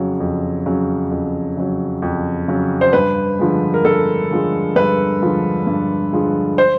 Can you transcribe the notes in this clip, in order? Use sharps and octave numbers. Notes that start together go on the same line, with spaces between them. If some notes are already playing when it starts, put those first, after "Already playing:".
Already playing: F2 C#3 F#3
F2
C#3 F#3
F2
C#3 F#3
F2
C#3 F#3
C5
G2 B4
D3 F3 G#3
A#4
G2 A4
D3 F3 G#3
G2 B4
D3 F3 G#3
G2
D3 F3 G#3
C5